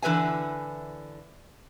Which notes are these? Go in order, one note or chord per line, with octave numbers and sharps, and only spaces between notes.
D3 E3 A#4 B4 E5 G#5